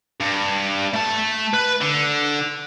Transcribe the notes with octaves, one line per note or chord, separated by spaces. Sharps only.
G2
A3 A5
B4
D3